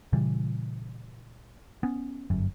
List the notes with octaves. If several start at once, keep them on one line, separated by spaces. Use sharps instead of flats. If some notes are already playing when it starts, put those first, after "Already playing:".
A#2 C#3 E3 G3
B3 C#4
G1 F#2